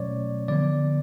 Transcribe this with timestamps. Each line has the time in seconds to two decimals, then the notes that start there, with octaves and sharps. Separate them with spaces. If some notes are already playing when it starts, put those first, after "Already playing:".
Already playing: B2 F#3 A3 C#4 C#5 D5
0.48 D3 F3 B3 D5